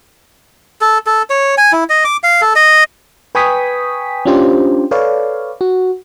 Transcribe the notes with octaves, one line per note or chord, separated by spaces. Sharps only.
A4
A4
C#5
G#5
E4
D#5
D6
F5
A4
D#5
B4 G5 G#5 C#6 D#6 B6
C#4 D4 F4 G4 C5
A4 B4 C#5 D5 F5
F#4